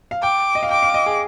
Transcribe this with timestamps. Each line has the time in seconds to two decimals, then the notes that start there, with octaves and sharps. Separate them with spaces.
0.11 F5
0.22 G5 D6
0.55 D#5
0.63 F5
0.71 G5 D6
0.83 F5
0.94 D#5
1.06 G#4